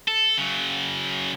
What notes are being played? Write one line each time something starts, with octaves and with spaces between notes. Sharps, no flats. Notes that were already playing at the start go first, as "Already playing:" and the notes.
A4
C#3 F#3